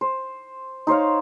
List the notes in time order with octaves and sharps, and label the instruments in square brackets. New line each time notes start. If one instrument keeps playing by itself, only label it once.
[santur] C5
D#4 C5 C#5 F5